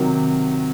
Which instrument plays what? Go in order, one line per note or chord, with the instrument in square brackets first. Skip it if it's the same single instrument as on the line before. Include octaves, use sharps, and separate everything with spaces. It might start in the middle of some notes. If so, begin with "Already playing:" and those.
Already playing: [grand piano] C3 D#3 F#3